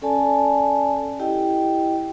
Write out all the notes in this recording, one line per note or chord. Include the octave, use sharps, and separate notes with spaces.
C#4 A4 D5 G#5 A5
E4 G4 D#5 G5